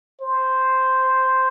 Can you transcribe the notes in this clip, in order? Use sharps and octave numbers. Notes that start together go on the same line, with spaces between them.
C5